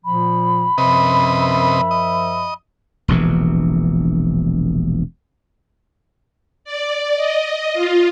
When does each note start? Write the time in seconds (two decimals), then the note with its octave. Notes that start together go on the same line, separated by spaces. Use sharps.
0.05 A#2 F3 B5
0.78 F#2 C3 F3 B4 D#5 E5
1.91 D#5
3.08 E1 A#1 C3 E3
6.64 D5
7.16 D#5
7.74 F4